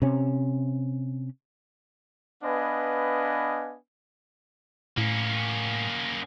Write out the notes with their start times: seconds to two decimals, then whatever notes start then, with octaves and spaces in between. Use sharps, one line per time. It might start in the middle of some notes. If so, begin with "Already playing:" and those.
0.02 C3 C#4
2.43 B3 D4 B4 D#5 F5 G#5
4.98 A2 A#3 C#4